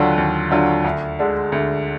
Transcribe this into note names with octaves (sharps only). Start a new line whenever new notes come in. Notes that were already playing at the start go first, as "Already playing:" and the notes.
Already playing: D#2 D3 F#3 D4 F4
D#2
D3 F#3 D4 F4
D2
D3 G#3 D4
D2